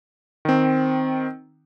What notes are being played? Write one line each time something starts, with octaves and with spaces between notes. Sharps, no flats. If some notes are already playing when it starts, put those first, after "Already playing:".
D#3 C4